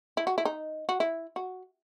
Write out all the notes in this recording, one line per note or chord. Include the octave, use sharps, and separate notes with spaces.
E4
F#4
E4
D#4
F#4
E4
F#4